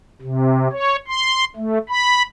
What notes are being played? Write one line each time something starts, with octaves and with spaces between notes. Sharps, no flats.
C3
C#5
C6
A3
B5